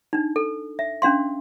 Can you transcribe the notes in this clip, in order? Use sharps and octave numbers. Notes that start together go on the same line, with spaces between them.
D4 D#4
A4
E5
C#4 D4 F5 C6